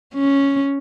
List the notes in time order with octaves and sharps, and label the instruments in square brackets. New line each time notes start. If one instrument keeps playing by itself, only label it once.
[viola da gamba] C#4